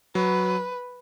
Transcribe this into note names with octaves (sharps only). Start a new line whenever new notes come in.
F#3 B4